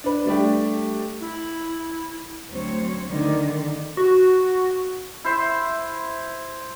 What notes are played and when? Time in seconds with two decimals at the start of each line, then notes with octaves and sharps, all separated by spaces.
0.04 D4 B4
0.26 G3 A3 D4 G4
1.20 E4
2.50 D2 F#3 C4 C5 C#5
3.09 D3 D#3
3.97 F#4
5.24 E4 C5 E5